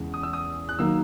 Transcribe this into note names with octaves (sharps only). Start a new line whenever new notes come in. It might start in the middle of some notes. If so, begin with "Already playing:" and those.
Already playing: E2 C#3 E3 G#3
D#6
E6
D#6
F#6
D#3 F#3 A#3 E6